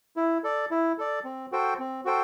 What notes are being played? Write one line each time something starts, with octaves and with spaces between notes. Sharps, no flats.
E4
A4 D5
E4
A4 D5
C4
F#4 A4 C5 G5
C4
F#4 A4 C5 G5